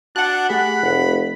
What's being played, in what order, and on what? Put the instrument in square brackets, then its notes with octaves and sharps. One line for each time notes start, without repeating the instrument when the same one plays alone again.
[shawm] D4 [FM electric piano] F#4 A5 [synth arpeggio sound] F#5 F#6
[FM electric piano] A3 G4 G#4 [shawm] B5
[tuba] F1